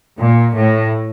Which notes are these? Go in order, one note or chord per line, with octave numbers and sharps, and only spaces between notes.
A#2
A2